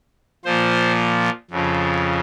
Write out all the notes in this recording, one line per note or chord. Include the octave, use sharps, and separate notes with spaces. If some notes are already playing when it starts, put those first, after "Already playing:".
A#2 F3 C5
F2 C#3 F3